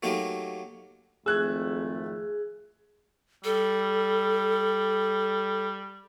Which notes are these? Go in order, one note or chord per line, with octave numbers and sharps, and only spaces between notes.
F#3 A3 A#3 D#4 G4
G#1 F2 A3 G#4 E6 F#6 G#6
G3 A4